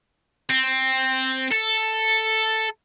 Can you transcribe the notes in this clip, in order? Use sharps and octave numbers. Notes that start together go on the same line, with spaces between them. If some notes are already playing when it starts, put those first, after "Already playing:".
C4
A4